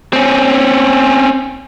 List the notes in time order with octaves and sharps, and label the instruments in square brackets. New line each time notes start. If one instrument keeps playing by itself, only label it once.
[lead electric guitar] C4 C#4